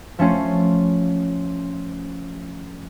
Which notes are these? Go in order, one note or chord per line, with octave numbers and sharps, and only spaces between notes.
F3 A3 C#4 F4